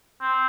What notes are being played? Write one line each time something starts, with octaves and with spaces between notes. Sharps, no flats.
C4